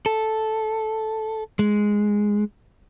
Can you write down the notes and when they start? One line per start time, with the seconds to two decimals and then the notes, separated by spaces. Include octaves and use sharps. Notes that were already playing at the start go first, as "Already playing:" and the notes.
0.06 A4
1.59 G#3